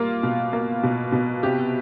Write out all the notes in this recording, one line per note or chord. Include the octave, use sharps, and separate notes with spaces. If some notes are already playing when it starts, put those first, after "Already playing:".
Already playing: G3 A#3 F4
B2
A#3
B2
B2
C3 G4